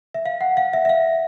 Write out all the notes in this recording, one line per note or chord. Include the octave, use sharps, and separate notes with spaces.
E5
F5
F#5
F5
E5
E5
F5